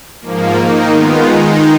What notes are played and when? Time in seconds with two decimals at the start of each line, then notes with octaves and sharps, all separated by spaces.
0.21 G#2 F3 A#3
0.55 D#3 A#3 D#4
0.90 D#3 G#3 B3 F4
1.24 D#3 G#3 D#4